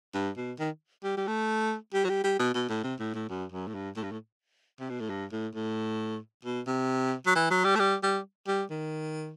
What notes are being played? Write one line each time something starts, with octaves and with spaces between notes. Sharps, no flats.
G2
B2
D#3
G3
G3
A3
G3
F#3
G3
G3
B2
B2
A2
C3
A2
A2
F#2
F#2
A2
G2
A2
G2
A2
C3
B2
A2
G2
A2
A2
B2
C3
F#3
E3
F#3
G3
A3
G3
G3
G3
D#3